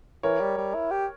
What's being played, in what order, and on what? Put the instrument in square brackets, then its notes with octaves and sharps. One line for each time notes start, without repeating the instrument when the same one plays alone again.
[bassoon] E3 [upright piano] A#4 C#5
[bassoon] G3
G3
E4
G4